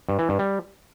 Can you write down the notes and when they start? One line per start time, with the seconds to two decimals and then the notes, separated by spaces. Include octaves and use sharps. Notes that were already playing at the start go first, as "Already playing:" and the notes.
0.09 G2
0.19 E3
0.29 G2
0.39 G3